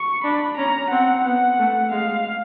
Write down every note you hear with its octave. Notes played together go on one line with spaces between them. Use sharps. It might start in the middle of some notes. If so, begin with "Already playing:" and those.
Already playing: C#6
D4 B5
C#4 A#5
C4 F#5
B3 F#5
A3
G#3 F5